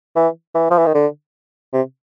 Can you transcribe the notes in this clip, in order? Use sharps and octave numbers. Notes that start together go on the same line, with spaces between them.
E3
E3
F3
E3
D#3
D3
C3